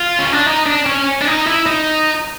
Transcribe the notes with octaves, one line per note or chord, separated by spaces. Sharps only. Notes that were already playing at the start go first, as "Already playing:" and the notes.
Already playing: F4
C#4
D4
D#4
D4
C#4
D4
D#4
E4
D#4